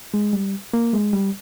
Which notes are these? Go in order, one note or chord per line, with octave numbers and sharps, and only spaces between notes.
G#3
G3
A#3
G#3
G3